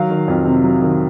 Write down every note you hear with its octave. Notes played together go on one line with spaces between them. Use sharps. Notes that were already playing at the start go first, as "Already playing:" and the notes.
Already playing: D#3 F#3 F5
D#3
F2
C3
F#3
D#3